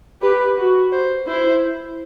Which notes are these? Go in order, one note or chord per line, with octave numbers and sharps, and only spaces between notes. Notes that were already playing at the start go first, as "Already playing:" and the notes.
G4 B4
F#4
C5
E4 C5